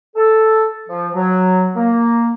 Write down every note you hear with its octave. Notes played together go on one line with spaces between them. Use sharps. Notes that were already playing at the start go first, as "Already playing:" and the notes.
A4
F3
F#3
A#3